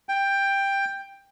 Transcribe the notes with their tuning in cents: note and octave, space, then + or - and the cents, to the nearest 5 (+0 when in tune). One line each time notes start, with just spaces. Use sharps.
G5 +10